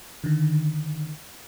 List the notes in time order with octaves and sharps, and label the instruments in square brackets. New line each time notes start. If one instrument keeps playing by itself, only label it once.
[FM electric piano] D3 D#3